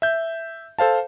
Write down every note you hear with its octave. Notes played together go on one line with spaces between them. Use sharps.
E5 G6
A4 C5 F5 A5